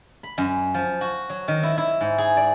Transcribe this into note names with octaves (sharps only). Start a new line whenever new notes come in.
B5
F#2
F3
F#4
F#3
D#3
E4
E4
G#2
G#4
D5